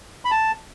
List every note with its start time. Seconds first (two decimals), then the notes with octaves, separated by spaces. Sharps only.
0.25 B5
0.31 A5